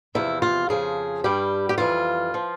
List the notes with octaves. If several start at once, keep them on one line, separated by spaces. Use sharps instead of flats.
E2 C3 F3 E4
F4
F2 C#3 F3 G#4
G2 G3 G4
G4
F2 E3 G3 F4
F3